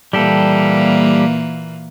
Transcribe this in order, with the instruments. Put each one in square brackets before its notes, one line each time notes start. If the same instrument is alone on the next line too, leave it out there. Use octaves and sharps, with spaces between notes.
[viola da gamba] A#2 E3 A#3 [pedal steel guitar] G3 G4 A4